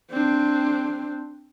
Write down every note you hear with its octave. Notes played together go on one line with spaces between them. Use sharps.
C4 D4